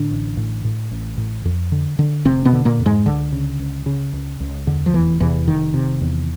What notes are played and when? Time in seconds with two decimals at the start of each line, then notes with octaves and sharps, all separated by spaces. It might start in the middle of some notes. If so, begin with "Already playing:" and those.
Already playing: A2 D3 D4
0.11 A1
0.37 A2
0.65 A2
0.92 A1
1.18 A2
1.45 F2
1.72 D3
1.99 D3
2.25 F1 C3 C4
2.45 B2 B3
2.53 D3
2.65 A#2 A#3
2.79 F2
2.86 G#2 G#3
3.06 C#2 D3
3.33 C#3
3.59 C#2
3.86 C#3
4.13 C#2
4.40 C#2
4.67 E2 D3
4.86 F3
4.94 F1 E2 E3
5.20 E2 C3 E3
5.47 F1 D#3
5.74 C3
6.01 E2